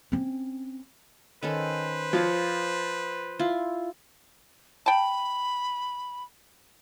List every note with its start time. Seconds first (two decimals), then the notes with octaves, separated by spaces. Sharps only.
0.12 C4 C#4
1.43 D#3 C#4 A4 B4 C5
2.13 F3 C#5 F5 D6
3.39 E4 F4 C6
4.86 G5 A5 B5